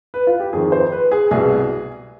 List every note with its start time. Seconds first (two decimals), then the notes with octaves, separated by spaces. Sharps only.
0.14 B4
0.27 F4
0.40 G4
0.53 F2 D#3 G#4
0.72 C5
0.92 B4
1.11 G#4
1.31 C2 B2 G#4